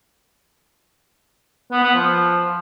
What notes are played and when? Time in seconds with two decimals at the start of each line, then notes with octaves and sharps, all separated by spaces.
1.72 B3
1.83 B3
1.95 F3